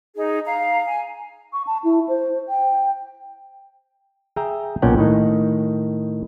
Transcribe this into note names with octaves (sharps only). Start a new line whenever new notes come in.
D#4 G#4
F5 A#5
G#5
C#6
A5
E4
C5
G5
G#4 E5 G5 A#5
B1 A#2 C#4 F#5 G5
A2 D#3 D#4